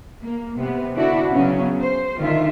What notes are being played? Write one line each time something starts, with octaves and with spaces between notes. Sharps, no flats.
A#3
C3 B3
D3 C4 D4 E4 F#4
C#3 F#3 B3 C#4
C5
D3 D#3 F4 E5